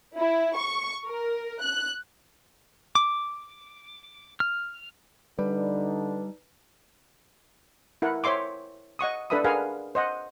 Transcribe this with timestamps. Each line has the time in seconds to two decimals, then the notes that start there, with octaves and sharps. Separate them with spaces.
0.16 E4
0.55 C#6
1.06 A#4
1.61 F#6
2.95 D6
4.40 F6
5.39 D3 G3 D4 D#4 B4
8.02 E4 A#4 F#5
8.24 C5 C#5 E5 C6 D6
8.99 D#5 F#5 C#6 D#6
9.30 D4 A4 B4 E5 B5 D#6
9.44 G#4 A#4 B4 F5 F#5 G#5
9.95 C5 D#5 F#5